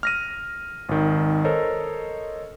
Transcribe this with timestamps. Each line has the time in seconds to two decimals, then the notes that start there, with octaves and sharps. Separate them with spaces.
0.03 F6 A#6 D#7
0.89 G#1 D#3
1.44 A4 A#4 C5 C#5 D#5